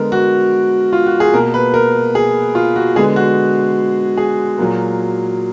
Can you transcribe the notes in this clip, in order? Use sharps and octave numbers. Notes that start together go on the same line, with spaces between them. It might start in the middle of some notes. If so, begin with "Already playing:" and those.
Already playing: D3 G#3 B3 A#4
F#4
F4
F#4
G#4
B2 A#3 A#4
B4
A#4
G#4
F4
F#4
D3 G#3 B3 G#4
F#4
G#4
A#2 F#3 A#3